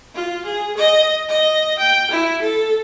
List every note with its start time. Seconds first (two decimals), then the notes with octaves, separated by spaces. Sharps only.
0.14 F4
0.45 G#4
0.77 D#5
1.29 D#5
1.78 G5
2.10 E4
2.41 A4